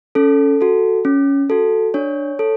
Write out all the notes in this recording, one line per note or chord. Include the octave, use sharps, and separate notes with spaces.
C#4 A4
F#4 A4
C#4
F#4 A4
D4 C#5
A4